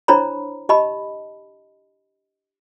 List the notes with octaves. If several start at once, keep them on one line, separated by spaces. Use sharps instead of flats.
D4 E4 C5 C#5 A#5 B5
G4 D#5 A5 B5